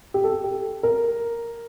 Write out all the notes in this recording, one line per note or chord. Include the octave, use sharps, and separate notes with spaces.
G4
A4
G4
A#4